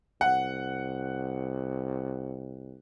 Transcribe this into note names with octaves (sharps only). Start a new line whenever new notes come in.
C2 F#5